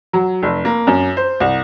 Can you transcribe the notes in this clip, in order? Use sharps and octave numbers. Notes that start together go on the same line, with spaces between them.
F#3
F1
A#3
F#2
C5
C2